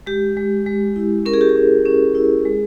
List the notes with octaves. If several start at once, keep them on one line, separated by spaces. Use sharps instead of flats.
G#3 G4
G#3
G#3
E4
C#4 A#4
G#4
G4
G#4
C#4
C#4
E4
G#3